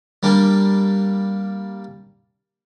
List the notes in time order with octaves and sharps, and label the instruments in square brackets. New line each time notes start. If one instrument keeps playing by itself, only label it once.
[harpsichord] G3 A#3 D4